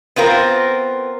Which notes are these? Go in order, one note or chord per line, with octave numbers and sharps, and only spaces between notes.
B3 C4 F4 A#4